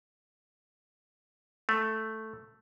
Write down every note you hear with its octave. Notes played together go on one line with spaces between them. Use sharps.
A3